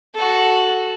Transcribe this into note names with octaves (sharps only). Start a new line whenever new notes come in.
F#4 A4